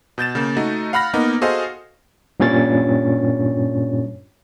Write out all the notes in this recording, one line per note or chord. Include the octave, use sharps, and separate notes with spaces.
B2 G6 A6 E7
C#3 A#3
A3 D#4 F#4
F5 F#5 B5 F6 A#6
A#3 B3 D#4
F#4 G#4 A4 C5 D#5 F5
G2 A#2 C#4 C#5 A6